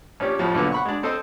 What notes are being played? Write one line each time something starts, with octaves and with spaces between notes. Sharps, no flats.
A#1 C#4 G4
F2 A2 F3
B1 A#2 D3 B3
F#5 B5 C#6
G#3 D4
C4 A4 C5 D#5